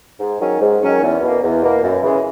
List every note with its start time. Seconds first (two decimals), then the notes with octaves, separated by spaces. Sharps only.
0.20 G#2
0.41 D#3 F#3 C#4
0.61 G#2
0.82 D#3 F#3 C#4
1.02 E2
1.22 B2 A#3
1.43 E2
1.63 B2 A#3
1.83 F#2
2.02 C#3 E3 G#3